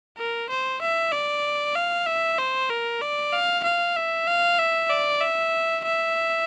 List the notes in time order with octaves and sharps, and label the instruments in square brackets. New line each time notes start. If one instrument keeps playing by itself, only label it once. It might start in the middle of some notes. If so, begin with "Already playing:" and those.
[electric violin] A#4
C5
E5
D5
F5
E5
C5
A#4
D5
F5
F5
E5
F5
E5
D5
E5
E5